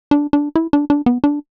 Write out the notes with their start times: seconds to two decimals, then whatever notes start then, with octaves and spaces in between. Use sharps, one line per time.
0.11 D4
0.33 D4
0.56 E4
0.73 D4
0.90 D4
1.06 B3
1.24 D4